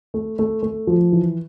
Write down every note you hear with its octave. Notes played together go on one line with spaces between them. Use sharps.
A3
A3
A3
F3
E3